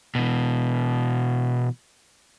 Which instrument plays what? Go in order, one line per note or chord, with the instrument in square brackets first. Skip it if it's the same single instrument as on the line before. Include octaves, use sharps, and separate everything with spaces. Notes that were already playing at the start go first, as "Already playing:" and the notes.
[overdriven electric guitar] B2 E3